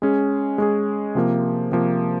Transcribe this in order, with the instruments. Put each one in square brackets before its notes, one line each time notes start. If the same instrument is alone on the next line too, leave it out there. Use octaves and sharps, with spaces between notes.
[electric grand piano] G#3 C#4 G#4
G#3 C#4 G#4
C3 F3 A#3
C3 F3 A#3